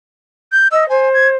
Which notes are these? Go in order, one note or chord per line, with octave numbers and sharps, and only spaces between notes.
G6
D#5 E6
C5 G#5
G#6